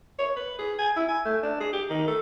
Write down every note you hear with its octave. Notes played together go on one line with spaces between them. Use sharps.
C#5
B4
G#4
G#5
E4
G#5
A3
D4
G#4
G4
D#3
A4